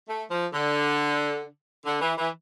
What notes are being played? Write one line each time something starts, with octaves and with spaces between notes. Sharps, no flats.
A3
F3
D3
D3
E3
E3